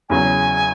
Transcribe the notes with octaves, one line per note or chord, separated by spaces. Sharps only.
E2 C#3 F#3 G#5